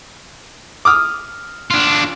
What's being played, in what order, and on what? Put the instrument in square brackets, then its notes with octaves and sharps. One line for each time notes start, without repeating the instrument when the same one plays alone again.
[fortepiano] D6 D#6 F6
[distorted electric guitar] D4 F4